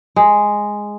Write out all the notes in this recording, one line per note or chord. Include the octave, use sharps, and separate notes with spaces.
G#3